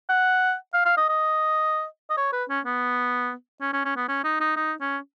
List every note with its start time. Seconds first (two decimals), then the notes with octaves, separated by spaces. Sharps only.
0.09 F#5
0.74 F5
0.85 F5
0.97 D#5
1.09 D#5
2.10 D#5
2.17 C#5
2.33 B4
2.49 C#4
2.65 B3
3.61 C#4
3.73 C#4
3.85 C#4
3.96 B3
4.08 C#4
4.24 D#4
4.40 D#4
4.56 D#4
4.81 C#4